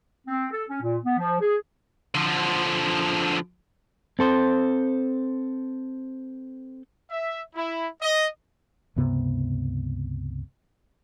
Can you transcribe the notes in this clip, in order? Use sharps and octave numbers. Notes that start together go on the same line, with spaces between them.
C4
A4
C#4
A#2
B3
F3
G#4
D3 F3
C4 A4 C5
E5
E4
D#5
C#2 G2 C3 B3